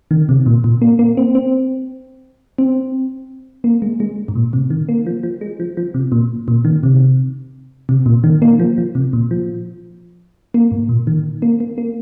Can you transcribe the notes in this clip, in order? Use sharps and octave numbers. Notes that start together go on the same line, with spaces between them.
D#3
C3
A#2
A#2
A#3
A#3
C4
C4
C4
A#3
G#3
G#3
G#2
A#2
C3
D#3
A#3
F3
F3
G#3
F3
F3
C3
A#2
A#2
D#3
C3
C3
A#2
D#3
A#3
F3
F3
C3
A#2
F3
A#3
G#2
A#2
D#3
A#3
A#3
A#3